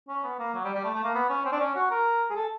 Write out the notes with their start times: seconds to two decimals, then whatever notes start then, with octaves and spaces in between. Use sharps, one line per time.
0.09 C#4
0.24 B3
0.39 A#3
0.54 F#3
0.64 G3
0.75 G3
0.84 A3
0.95 A3
1.04 A#3
1.15 B3
1.29 C#4
1.45 C4
1.52 D4
1.60 C#4
1.76 F#4
1.91 A#4
2.30 G#4
2.36 A4